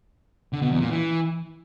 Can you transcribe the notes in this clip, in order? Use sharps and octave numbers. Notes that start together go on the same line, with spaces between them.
D3
B2
E2
A#2
E3